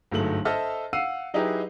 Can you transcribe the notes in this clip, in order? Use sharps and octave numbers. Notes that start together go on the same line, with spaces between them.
G1 G#2 F#3 A3 F#7
A4 C5 D#5 E5 A5 F6
F5 F#5 E6 C7 D#7
F#3 D#4 E4 G4 G#4 B4